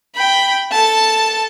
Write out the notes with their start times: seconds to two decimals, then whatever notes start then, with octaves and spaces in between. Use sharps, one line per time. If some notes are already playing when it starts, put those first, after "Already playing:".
0.15 G5 B5
0.71 A4 A5